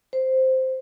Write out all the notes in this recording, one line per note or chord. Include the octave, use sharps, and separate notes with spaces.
C5